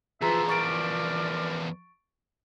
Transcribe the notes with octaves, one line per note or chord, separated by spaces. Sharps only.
E2 F3 F4 G#4 B4 E5 A#5
A#4 B4 D5 C#6 A6 D7